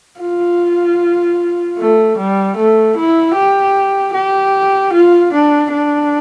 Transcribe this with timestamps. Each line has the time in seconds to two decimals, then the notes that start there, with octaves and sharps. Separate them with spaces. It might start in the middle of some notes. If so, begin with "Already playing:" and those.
0.21 F4
1.78 A3
2.18 G3
2.56 A3
2.96 E4
3.36 G4
4.14 G4
4.93 F4
5.34 D4
5.73 D4